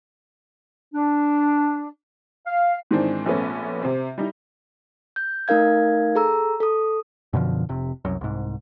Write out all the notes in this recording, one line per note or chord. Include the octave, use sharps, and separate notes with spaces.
D4
F5
G#2 D#3 E3 C4 D4
A#1 A3 B3 C#4
C3 C4
G3 D#4 E4
G6
A3 D#4 A#4 F5 G#6
G#4 A4 A#5 E6
A4 D#6
F#2 B2 D3 F3
F1 C3
C2 F#2
C2 G#2